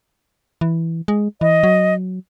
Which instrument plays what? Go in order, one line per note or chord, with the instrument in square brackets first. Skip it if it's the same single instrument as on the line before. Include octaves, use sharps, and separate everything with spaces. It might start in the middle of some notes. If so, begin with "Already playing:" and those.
[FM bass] E3
G#3
[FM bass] E3 [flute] D#5
[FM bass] F#3